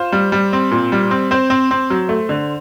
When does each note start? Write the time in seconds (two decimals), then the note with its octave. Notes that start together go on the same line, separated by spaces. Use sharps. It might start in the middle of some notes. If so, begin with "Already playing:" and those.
Already playing: F4 C5
0.12 G3
0.32 G3
0.53 C4
0.71 A#2
0.92 G3
1.11 C4
1.31 C4 C5
1.50 C4
1.71 C4
1.90 F#3
2.09 A3
2.29 D3